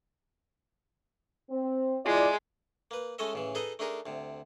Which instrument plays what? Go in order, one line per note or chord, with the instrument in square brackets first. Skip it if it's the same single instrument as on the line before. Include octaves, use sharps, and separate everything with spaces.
[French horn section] C4
[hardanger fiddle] G#3 [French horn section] E4 F4 D5
[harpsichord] A#3 B4
G#3 A3 C#4 A4 D#5 E5
A1 C#3 E3
D#4 G#4 A4 B4 D#5
A3 D4 D#4 G#4 A#4
D2 C3